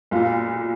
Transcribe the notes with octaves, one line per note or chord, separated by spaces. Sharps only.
B1 A#2 F4
F4